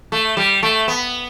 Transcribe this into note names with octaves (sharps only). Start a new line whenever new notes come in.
A3
G3
A3
B3